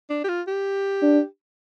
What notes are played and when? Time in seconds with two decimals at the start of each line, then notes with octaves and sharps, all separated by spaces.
0.10 D4
0.24 G4
0.28 F4
0.47 G4
1.02 D4